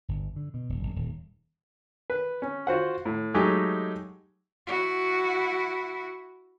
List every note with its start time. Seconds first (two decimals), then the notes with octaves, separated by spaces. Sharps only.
0.08 G1
0.36 D3
0.54 B2
0.69 D#1
0.83 F#1
0.96 D#1
2.10 B4
2.42 C#4
2.67 F4 F#4 C5 F#5
3.06 A2
3.34 F#3 G#3 A3 D#4 G4
4.67 E4 F#4